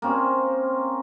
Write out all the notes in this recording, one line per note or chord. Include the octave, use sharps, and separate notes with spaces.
A#3 C4 C#4